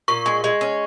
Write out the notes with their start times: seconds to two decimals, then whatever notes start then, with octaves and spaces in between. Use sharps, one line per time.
0.08 A#2 C#6
0.26 G#3
0.44 G#3
0.61 C#4